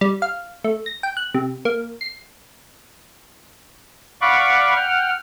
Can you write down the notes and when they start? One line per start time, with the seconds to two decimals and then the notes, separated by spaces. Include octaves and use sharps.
0.01 G3
0.22 F5
0.64 A3
0.86 A#6
1.03 G5
1.17 F#6
1.34 C3
1.65 A#3
2.01 C7
4.21 D5 F5 F#5 B5 C#6 D6
4.76 F#5 G5 F6